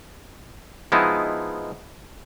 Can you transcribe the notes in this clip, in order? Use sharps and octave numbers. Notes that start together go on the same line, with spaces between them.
F3 G#3 B3 D#4 E4